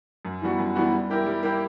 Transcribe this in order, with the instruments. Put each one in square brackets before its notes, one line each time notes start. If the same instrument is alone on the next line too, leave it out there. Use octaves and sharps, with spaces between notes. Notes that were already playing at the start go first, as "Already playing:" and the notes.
[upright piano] F#2
E3 G3 B3 F#4
F#2
E3 G3 B3 F#4
G3
A#3 E4 G4 A#4
G3
A#3 E4 G4 A#4